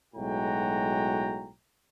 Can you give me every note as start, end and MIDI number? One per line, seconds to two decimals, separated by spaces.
0.14 1.50 35
0.14 1.50 45
0.14 1.50 56
0.14 1.50 66
0.14 1.50 79
0.14 1.50 82